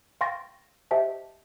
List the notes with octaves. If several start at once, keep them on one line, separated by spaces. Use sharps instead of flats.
F5 G5 C6 C#6 A6 A#6
G4 C5 D#5 E5 G5 A5